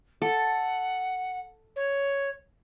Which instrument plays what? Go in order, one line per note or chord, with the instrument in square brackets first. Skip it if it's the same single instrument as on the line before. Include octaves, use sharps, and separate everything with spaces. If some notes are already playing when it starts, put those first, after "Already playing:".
[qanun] A4 [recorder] F#5
[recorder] C#5